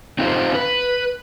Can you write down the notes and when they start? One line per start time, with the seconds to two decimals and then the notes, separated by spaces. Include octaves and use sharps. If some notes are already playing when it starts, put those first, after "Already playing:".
0.19 C4 D#4 F4 G4 C5
0.55 B4